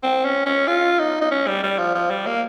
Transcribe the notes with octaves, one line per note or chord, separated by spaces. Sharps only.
C4
C#4
C#4
F4
D#4
D#4
C#4
G3
G3
F3
F3
G3
A#3